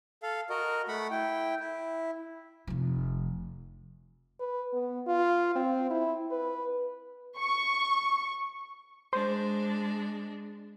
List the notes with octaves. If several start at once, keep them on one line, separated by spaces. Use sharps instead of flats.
A4 F5
F#4 A#4 D#5
A3 F#5 B5
E4 G5
E4
F1 F3
B4
B3
F4
C4
E4
B4
C#6
G#3 D4 C5